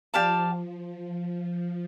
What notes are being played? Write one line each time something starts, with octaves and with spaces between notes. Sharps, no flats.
F3 G4 D5 F5 A5